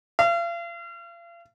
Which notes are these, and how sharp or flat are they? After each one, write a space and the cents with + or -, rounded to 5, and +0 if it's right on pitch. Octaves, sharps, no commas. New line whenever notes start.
F5 -40